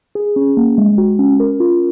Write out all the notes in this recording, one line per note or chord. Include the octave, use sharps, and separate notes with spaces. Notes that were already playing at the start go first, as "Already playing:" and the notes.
G#4
C#4
A#3
G#3
F#4
C#4
A#4
F4